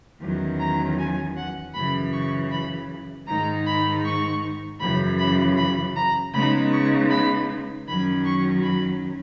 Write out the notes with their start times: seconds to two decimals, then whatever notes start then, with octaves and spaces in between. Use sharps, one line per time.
0.20 E2 D#3 F#3 C#4
0.59 A#5
0.98 G#5
1.36 F#5
1.73 F#2 C#3 E3 B5
2.12 C#6
2.51 B5
3.27 G#2 D#3 G#3 D#4 A#5
3.66 B5
4.04 C#6
4.80 F#2 C#3 E3 B5
5.18 B5
5.56 B5
5.96 A#5
6.33 C#3 G#3 B3 D#4 B5
6.71 C#6
7.10 B5
7.87 F#2 D#3 F#3 C#4 B5
8.25 C#6
8.63 B5